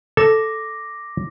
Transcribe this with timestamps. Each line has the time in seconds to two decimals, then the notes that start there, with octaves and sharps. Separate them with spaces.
0.17 A4 D6 A#6